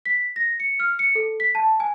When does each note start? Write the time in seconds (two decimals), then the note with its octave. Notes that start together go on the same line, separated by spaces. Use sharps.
0.06 B6
0.36 A#6
0.60 C#7
0.80 F6
0.99 C#7
1.15 A4
1.40 B6
1.55 A5
1.80 G#5